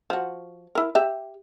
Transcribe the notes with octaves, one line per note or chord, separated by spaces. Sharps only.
F3 F#4
E4 A#4
G4 E5